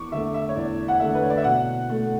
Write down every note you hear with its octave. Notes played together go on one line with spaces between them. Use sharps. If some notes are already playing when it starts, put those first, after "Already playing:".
Already playing: E2 C#6 D6
D3 A3 E5
E5
C#5
E2 D5
F#5
D3 A3 E5
B4
C#5
D5
E5
B2 F#5
A3